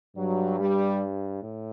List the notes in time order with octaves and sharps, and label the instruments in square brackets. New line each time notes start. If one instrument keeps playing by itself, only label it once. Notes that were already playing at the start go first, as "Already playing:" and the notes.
[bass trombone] G2 [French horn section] F#3
[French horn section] G3
[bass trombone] A2